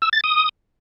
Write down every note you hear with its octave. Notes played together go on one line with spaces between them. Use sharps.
E6
A6
D#6